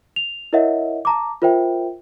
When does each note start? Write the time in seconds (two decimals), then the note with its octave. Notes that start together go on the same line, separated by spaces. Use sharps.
0.16 F7
0.53 E4 A#4 C#5 D#5 E5 F#5
1.05 A5 A#5 D6
1.42 F4 A#4 C5 E5 G5